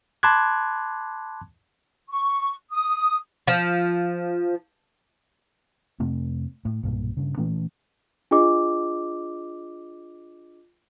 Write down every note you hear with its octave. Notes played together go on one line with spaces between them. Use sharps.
A5 B5 C6 D6 F#6 G#6
C#6
D#6
F3
F2 C3 A3 C4
A2
B1 G2 A#2
G2 C#3
A#2 E3 A3 C#4
D4 F4 G#4 D#5 D6